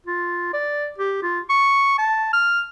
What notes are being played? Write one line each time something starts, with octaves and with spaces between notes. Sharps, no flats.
F4
D5
G4
F4
C#6
A5
F6